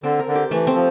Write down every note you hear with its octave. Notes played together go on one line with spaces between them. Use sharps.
D3 C4
A#4
D3
G4
E3 A3
C4
F3